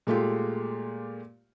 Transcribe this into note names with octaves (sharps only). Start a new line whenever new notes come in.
A#2 G#3 A3 F4 G4